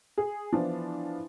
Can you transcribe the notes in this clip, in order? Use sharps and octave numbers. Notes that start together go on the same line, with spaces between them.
G#4
E3 F3 B3 D4